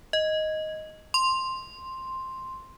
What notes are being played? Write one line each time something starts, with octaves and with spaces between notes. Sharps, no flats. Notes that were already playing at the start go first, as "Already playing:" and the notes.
D#5
C6